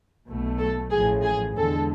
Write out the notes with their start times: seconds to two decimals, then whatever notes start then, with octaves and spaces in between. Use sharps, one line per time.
0.27 B1 B2 A3
0.59 A4
0.91 A1 A2 F3 G#4
1.24 G#4
1.55 E2 D3 G#3 A4